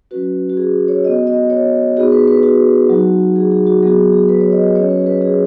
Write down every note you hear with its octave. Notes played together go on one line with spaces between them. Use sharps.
F#3 C#4 F#4 B4
F#4
G#4
C#5
B3 F#4 D#5
D#5
C#5
B3 D#4 F#4 G#4
B4
B4
F#4
F#3 D#4 F#4
G#4
G#4
F#4
F#3 B3 F#4 G#4
G#4
B4
C#5
D#5
D#5
F#3 C#4 F#4 C#5
B4
G#4
B4
G#4